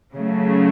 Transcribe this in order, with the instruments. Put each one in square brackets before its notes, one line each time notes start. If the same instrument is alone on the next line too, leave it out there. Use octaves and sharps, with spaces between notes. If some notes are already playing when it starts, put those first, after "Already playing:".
[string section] C#3 F#3 A3